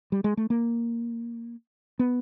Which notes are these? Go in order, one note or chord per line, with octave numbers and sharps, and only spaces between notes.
G3
G#3
A3
A#3
B3